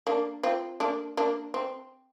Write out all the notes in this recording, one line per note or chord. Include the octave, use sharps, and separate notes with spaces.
A#3 D4
C4 F4
A#3 D4
A#3 D4
C4